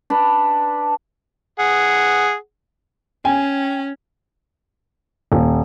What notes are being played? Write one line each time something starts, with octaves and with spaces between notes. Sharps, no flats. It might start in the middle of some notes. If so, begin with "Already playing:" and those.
D4 B4
G#4 F#5
C#4 G5 G#5
D#1